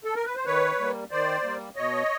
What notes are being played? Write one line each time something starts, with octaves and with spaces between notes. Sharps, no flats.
A4
A#4
B4
C5
D#3 B4 C#5
G3 A#3
D#3 C5 D5
G3 A#3
B2 C#5 D#5